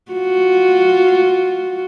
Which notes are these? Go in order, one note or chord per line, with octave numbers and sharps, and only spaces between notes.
F4 F#4